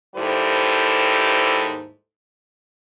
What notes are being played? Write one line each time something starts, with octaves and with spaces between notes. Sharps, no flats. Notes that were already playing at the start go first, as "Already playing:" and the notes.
D#2 G#2 G3 E4 A4 C5